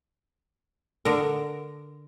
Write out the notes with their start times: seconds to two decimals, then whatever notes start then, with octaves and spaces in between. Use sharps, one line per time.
1.05 D3 A#4